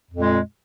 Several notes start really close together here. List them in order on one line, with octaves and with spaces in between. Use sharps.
F2 A#2 G#3